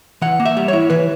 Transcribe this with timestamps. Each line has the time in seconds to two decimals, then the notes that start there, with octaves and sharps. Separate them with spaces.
0.22 E3 F#5
0.40 A#3
0.46 E5
0.57 G3
0.68 E4 C#5
0.90 E3 B4